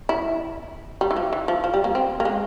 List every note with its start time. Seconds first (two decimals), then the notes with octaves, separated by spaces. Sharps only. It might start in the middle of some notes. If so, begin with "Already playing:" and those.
0.09 E4
1.01 G3
1.11 E3
1.16 F3
1.33 E3
1.48 F3
1.64 F3
1.74 G3
1.84 A#3
1.95 C4
2.20 A#3
2.25 G#3